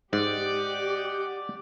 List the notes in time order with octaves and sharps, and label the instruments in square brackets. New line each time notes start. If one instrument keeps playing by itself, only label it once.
[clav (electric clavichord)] G#2 [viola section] G4 [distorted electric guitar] D5 [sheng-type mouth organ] D#5 F#5 G6